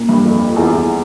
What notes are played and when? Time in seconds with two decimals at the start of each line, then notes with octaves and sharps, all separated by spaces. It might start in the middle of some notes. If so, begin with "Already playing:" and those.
Already playing: A#2
0.09 G2
0.24 F2
0.56 E2
0.71 E2